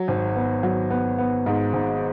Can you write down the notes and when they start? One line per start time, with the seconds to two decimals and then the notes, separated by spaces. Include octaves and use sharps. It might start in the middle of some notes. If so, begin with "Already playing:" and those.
Already playing: F#3
0.08 G#1
0.36 B3
0.63 F#3
0.90 B3
1.18 B3
1.46 G#2
1.73 G#1